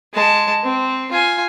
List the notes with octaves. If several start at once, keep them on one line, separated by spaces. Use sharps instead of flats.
G#3 A5
C4
F4 G#5